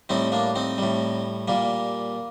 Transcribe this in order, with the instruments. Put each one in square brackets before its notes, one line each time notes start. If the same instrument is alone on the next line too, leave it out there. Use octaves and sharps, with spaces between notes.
[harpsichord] A2 G3 C4 D#4
A#3 D4
C4 D#4
A2 G3
A#2 G3 A#3